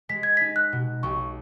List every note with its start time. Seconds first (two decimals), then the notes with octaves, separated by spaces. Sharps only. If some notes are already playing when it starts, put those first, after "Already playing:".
0.09 G#3 B6
0.23 G#6
0.37 B6
0.41 D#4
0.56 F#6
0.72 B2
1.03 B1 C#6